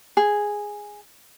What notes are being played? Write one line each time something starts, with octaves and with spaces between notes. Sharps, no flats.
G#4